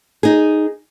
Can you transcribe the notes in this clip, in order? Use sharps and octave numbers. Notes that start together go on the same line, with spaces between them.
D#4 G#4